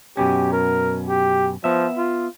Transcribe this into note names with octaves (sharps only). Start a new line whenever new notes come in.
F#2 B2 C#4 G4
A#4
G4
F3 B3 E5
F4